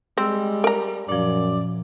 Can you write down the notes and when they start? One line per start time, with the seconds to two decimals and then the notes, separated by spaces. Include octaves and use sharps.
0.18 G3 G#3 C4 E6
0.64 A#4 D5 A#5
1.09 F#2 A#2 F3 D5